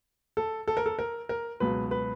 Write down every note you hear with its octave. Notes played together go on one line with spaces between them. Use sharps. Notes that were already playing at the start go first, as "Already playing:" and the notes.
A4
A4
A#4
A4
A#4
A#4
C#2 B2 F#3 B4
B4